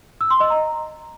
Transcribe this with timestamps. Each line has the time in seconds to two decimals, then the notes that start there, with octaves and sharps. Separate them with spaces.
0.21 E6
0.30 C6
0.40 D#5
0.50 A#5